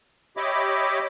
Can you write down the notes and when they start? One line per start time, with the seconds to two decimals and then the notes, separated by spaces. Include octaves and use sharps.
0.37 G4 C#5 D#5 E5 B5 D6